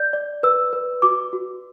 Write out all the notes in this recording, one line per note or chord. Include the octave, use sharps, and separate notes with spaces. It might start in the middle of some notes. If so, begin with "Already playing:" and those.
Already playing: D5 G6
D5
B4 E6
B4
F#4 D6
F#4